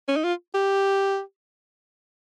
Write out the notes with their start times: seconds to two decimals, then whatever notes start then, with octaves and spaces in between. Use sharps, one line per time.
0.08 C#4
0.16 D#4
0.24 F4
0.54 G4